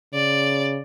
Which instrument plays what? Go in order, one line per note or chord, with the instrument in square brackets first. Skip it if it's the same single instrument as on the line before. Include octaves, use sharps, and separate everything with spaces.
[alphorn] C#3 [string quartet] D5